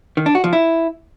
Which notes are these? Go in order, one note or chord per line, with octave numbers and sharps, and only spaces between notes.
D#3
D4
F#4
F3
E4